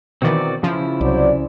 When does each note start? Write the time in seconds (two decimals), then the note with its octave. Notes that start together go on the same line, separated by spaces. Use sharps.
0.22 B2 D#3 E3 C4 F#4 D5
0.63 C#3 F3 E4
1.01 C2 F#3 C5 D5